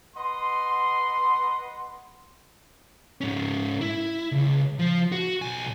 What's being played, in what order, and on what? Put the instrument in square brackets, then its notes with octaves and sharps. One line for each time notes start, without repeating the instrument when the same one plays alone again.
[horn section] B4 D#5 F#5 C6
[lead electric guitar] G#2 C#4
E4
C#2
F3
F#4
B1 G#5